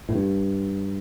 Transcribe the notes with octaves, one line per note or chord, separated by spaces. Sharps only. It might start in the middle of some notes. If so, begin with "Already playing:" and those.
A2
G2